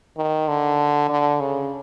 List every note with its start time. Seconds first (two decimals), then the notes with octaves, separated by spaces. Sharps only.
0.17 D#3
0.48 D3
1.09 D3
1.40 C#3